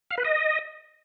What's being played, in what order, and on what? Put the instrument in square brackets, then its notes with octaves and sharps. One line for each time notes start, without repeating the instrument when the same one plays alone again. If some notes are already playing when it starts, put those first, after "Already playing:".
[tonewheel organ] F5
B4
D#5